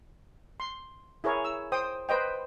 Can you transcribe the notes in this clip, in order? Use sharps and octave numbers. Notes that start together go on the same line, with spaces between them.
C6
E4 G#4 A#4 C#5
E6
C5 G5 D#6
B4 C5 D#5 G5